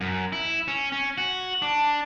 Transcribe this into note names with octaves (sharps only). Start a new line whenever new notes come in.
F#2
E4
C#4
C#4
F#4
D4